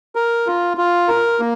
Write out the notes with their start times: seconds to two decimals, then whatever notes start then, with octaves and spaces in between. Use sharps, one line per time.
0.15 A#4
0.47 F4
0.77 F4
1.08 A#4
1.40 A#3